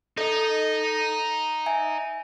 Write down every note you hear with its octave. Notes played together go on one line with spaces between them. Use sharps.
D#4 A4 D#5
E5 G#5